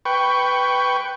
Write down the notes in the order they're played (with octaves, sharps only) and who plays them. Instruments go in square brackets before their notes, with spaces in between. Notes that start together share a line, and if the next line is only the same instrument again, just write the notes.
[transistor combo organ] B4 G5 C#6